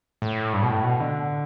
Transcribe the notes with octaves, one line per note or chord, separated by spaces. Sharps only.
A2
G2
B2
A2
B2
D3